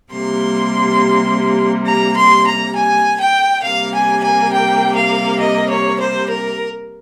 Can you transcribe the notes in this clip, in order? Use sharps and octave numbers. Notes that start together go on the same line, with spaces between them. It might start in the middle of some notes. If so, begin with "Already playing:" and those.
C3 G3 A#3 C6
A#5
C6
A#5
G#5
G5
C3 G3 A#3 F5
G#5
G#5
G5
F5
D#5
C#5
C5
A#4